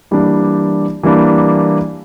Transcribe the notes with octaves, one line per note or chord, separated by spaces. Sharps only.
E3 G3 A#3 D4
E3 G3 A#3 D4